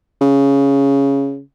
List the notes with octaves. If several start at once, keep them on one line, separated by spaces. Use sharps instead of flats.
C#3